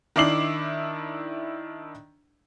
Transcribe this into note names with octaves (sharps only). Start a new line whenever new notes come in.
D#3 D4 E4 D6 C7 F#7